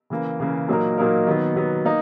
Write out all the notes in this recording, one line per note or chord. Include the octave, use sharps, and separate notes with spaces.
C#3 E3 A#3
C#3 E3 A#3
A#2 F#3 A#3 D#4 A#4
A#2 F#3 A#3 D#4 A#4
D#3 F#3 B3
D#3 F#3 B3
A#3 D#4